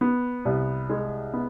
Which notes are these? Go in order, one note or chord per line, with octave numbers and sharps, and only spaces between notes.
B3
C2
G#3
B3